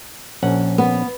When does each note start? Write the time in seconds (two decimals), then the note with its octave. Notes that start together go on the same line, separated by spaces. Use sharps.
0.43 A#1 C#4 F#5
0.78 B3